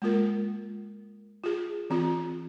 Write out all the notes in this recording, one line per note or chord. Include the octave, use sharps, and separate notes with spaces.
G#3 A#3 F4 A#4
F4 G#4
E3 C4 F4